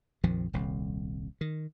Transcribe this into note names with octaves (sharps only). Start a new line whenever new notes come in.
A#1 F2 D#3 F3
D#1 C2
D#3